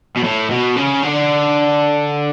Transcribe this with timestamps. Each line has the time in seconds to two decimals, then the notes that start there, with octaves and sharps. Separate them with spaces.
0.17 B2
0.24 A2
0.51 B2
0.76 C#3
1.03 D3